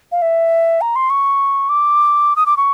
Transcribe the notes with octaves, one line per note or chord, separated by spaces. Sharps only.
F5
E5
A#5
C6
C#6
D6
D#6
D6
C#6